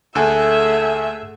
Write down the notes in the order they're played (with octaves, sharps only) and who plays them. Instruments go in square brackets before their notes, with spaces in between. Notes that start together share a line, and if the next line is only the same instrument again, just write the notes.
[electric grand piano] D2 G#5 [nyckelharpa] A3 G#4 [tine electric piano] A4 F#5 E6 [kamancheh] E5